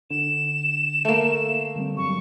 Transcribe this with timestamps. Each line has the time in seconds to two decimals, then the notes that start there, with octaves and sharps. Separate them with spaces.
0.11 D3 E7
1.05 A3 A#3
1.76 D3 G3 C4
1.97 G2 F#3 G3 C#6